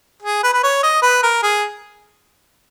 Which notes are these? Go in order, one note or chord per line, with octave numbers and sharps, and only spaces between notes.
G#4
B4
B4
C#5
D#5
B4
A#4
G#4